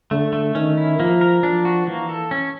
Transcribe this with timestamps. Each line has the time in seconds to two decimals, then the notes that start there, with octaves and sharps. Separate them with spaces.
0.11 D3 A3
0.33 A3
0.55 D#3 C#4
0.77 E4
0.99 F3 A#3
1.21 A#4
1.43 F3 D4
1.65 F#4
1.87 E3 A#3
2.09 A4
2.31 C#4